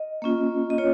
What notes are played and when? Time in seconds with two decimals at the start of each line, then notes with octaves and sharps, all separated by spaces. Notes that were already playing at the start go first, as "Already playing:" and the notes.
Already playing: D#5
0.22 A#3 C#4 F4
0.70 D#5
0.78 F4 C#5